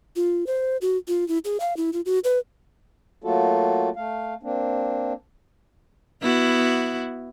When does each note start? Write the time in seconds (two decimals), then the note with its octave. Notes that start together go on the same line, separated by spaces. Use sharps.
0.16 F4
0.47 C5
0.82 F#4
1.08 F4
1.28 E4
1.45 G#4
1.60 F5
1.77 E4
1.93 F4
2.06 F#4
2.24 B4
3.24 F#3 A3 A#3 F4 F#4 A4
3.96 A3 F5
4.43 A#3 C4 D4
6.22 B3 E4 F#4